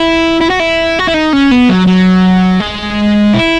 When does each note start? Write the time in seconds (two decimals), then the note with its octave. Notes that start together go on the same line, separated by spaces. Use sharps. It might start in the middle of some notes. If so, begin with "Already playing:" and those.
Already playing: E4
0.41 E4
0.50 F#4
0.59 E4
0.99 F#4
1.07 E4
1.14 D#4
1.33 C#4
1.51 B3
1.69 F#3
1.87 F#3
2.60 G#3
3.33 E4